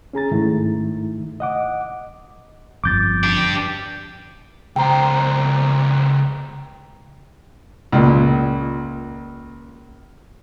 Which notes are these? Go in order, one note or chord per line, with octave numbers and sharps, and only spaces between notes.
C#4 G#4 A#5 A6
G#2 D#3 A3 E4
D#5 F#5 D6
G1 F2 D6 G6 A6
D4 G4
C#2 C5 G5 A#5
C#2 A#2